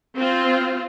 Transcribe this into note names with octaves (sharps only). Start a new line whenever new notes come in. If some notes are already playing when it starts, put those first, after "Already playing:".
C4 F4